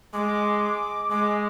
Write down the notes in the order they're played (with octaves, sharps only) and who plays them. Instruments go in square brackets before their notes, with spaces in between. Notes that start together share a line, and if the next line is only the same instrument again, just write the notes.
[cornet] G#3 [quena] D6
[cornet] G#3 [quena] D6